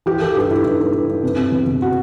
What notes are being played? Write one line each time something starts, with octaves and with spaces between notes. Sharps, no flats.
E3 G4
E3 A4
G2 G4
G2 E4
G2 E4
G2
G2
G2
C3
C3
E2
E2
F#4